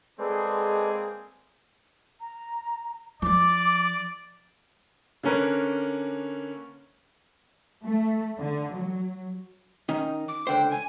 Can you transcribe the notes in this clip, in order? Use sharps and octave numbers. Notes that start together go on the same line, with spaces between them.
G#3 A#3 C4 G#4 A4 B4 D5
A#5
F3 F4 D5 D6
D3 A#3 C#4 A#4 B4
A3
D3
F#3
D#3 C#4 D#4
D6
C#2 D3 C5 G5
G#5